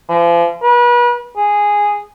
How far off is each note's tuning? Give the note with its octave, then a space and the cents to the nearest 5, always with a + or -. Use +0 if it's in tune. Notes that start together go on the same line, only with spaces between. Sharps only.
F3 -40
B4 -35
G#4 -10